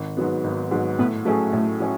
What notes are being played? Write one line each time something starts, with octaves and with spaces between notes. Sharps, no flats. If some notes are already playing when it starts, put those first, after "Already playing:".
Already playing: G#1
G#2 F#3 B3
G#1
G#2 F#3 B3
A2 B3
F#3 A3 C#4 G#4
A2
F#3 C#4